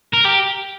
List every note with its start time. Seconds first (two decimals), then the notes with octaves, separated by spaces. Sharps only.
0.13 A#4
0.25 G4